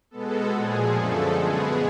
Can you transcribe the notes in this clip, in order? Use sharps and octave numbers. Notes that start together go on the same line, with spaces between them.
B2 G#3 B3 A4
A#2 F3 G#3 G#4
F#2 D3 F3 A3 A4
B2 G#3 B3 G#4